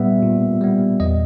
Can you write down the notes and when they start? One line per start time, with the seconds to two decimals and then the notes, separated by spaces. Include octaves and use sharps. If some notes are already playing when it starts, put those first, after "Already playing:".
Already playing: A#2 G3 B3 E5
0.22 A#2
0.61 G3 B3
1.00 E2 D#5